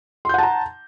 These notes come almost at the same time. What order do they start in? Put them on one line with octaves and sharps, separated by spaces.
C6 G6 F#5 A5 A#5